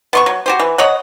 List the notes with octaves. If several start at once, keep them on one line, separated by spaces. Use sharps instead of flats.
B3 C6 C#6
F#3
F#4 G4 C5
E3
C#5 D#5 F#5